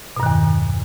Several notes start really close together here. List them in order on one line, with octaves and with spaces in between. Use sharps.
B2 G2 D#3 E2